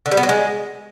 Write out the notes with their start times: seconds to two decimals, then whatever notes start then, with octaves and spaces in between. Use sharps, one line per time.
0.06 D3
0.11 G3
0.17 B3
0.23 F#3
0.29 G#3